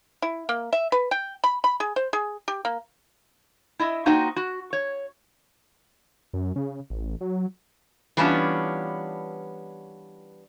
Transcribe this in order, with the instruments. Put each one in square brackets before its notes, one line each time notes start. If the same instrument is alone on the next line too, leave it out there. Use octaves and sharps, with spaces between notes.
[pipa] E4
A#3
E5
B4
G5
B5
B5
G#4
C5
G#4
G4
A#3
[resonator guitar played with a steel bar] E4 D#5 E5
A#3 D#4 F#4 C5 D#5 G5
F#4
C#5
[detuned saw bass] F#2
C#3
A1
F#3
[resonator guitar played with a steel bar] E3 G3 B3 C#4 D4 F4